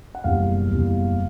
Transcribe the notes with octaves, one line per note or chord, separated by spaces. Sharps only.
F#5
F#1 E2 B2 G3 F5
F#1 E2 B2 G3